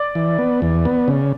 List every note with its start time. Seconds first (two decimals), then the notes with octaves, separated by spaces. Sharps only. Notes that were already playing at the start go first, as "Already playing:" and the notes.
Already playing: D5
0.15 E3
0.38 B3
0.62 E2
0.85 B3
1.08 C#3